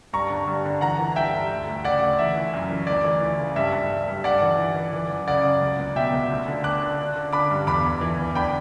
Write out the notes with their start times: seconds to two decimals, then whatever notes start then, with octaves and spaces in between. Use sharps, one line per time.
0.13 G2 A#5 C#6
0.30 D3
0.47 G2
0.65 D3
0.81 E3 F#5 A#5
0.99 E3
1.15 G2 E5 G5
1.34 G2
1.50 D2
1.67 D2
1.84 C#3 D5 F#5
2.02 D2
2.19 E3 E5
2.36 E3
2.54 F#2
2.70 E3
2.87 D2 D5
3.05 E3
3.21 E3
3.38 C#3
3.56 G2 E5
3.73 G2
3.90 G2
4.08 G2
4.24 G2 D5 F#5
4.42 E3
4.59 E3
4.76 E3
4.93 E3
5.10 F#2
5.27 C#3 D5 F#5
5.45 F#2
5.62 C#2
5.79 C#2
5.96 B2 E5 G5
6.14 C#2
6.30 D2
6.48 D3
6.64 D3 D6 F#6
6.82 D3
6.99 D3
7.16 D3
7.33 D3 B5 D6
7.51 G2
7.67 E2 B5 D6
7.84 E2
8.01 E3
8.19 E2
8.35 D3 G5 B5